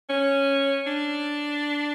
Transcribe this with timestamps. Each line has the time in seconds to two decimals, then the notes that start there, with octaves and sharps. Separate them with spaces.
0.10 C#4
0.87 D4